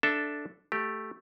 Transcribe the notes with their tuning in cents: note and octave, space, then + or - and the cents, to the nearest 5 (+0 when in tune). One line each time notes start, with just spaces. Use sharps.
D4 +0 A4 +0 E5 +0
A3 +0 G4 +0